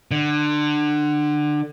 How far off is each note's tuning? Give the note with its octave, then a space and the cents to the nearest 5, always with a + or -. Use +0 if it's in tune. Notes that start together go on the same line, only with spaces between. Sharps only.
D3 +25